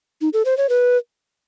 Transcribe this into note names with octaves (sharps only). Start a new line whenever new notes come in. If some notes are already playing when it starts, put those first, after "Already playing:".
D#4
A4
C5
C#5
B4